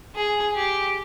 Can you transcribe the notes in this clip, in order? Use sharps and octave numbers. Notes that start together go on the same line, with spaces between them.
G#4
G4